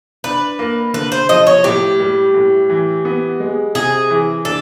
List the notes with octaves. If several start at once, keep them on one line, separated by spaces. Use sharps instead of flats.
D4 B4
A#3
D3 B4
C5
F3 D#5
C#5
A2 G4
G3
A2
E3
B3
G#3
C3 G#4
E3
D4 A4